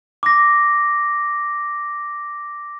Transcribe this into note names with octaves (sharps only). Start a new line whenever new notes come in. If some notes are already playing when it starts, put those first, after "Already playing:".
D6 A#6